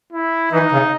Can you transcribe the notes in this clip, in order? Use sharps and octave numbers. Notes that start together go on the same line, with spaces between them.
E4
E3 D#4
C#3